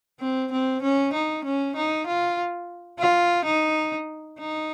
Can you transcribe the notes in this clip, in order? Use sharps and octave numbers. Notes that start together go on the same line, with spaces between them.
C4
C4
C#4
D#4
C#4
D#4
F4
F4
D#4
D#4